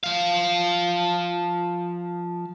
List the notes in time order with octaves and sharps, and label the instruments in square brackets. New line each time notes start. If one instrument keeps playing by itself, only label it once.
[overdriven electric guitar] F3 F5